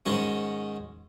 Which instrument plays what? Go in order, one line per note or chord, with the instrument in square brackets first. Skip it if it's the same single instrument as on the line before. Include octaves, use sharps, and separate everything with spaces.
[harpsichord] G#2 D#3 G#3 C#4 F#4